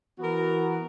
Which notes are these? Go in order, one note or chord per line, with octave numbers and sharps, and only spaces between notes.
E3 B3 F#4 A#4